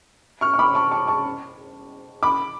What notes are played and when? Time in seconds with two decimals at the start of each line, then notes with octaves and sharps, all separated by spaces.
0.41 C#6 F6
0.54 C#6
0.59 B5 D6
0.75 A5 C#6
0.91 A5 C#6
1.07 A5 C#6
2.23 B5 D6